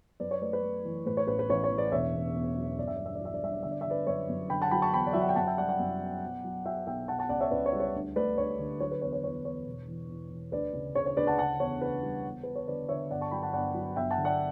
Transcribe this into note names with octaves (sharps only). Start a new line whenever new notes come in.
F#2 B4 D5
C#5
A3 B4 D5
B4
A3
E3
A2 B4
C#5
A1 B4
B4
A1 C#5
C#5
E3
B4 D5
E1 C#5 E5
E2
E2
F#3
G1 D5
E5
G2 D5
E5
D5
F#3 E5
D5
G2 E5
D5
D3 E5
D5
E5
D3 B4 D5
F#2 C#5 E5
F#2
D3 G5 B5
F#5 A5
F#3 G5 B5
A5 C#6
E2 G5 B5
D5
F#3 E5
F#5
G5
F#2 F#5 A5
E5 G5
G3 D5 F#5
D5 F#5
F#2
B3
B2
F#3
F#3 E5 G5
B1 E5 G5
B2 F#5 A5
F#5 A5
C#2 D5 F#5
C#5 E5
C#2 B4 D5
C#5
G3
C#5
D2
A3 B4 D5
D2 C#5
D3
F#3 C#5
B4
E2 C#5
C#5
E2 C#5
E2 C#5
E1
E3
E3
E3
D2 B4 D5
C#3
C#3 C#5
C#5
D2 B4 D5
F#5 A5
C#3 F#5 A5
E2 C#5
C#3 B4
G3
E2
B3 B4
C#5
D3 B4 D5
D3 C#5 E5
G1 D5 F#5
A5 C#6
F#3 G5 B5
F#5 A5
G1 D5 F#5
F#3
G1 E5 G5
F#5 A5
D3
D5 F#5